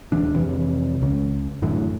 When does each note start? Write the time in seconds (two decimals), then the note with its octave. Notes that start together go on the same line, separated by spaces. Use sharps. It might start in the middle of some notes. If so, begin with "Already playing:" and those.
0.12 D#1 E3 D4
0.36 F2 C3 E3
1.01 C#2 C#3
1.62 F#2 A2 D3 E3